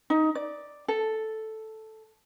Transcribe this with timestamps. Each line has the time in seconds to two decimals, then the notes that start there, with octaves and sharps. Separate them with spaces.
0.10 D#4
0.35 D5
0.88 A4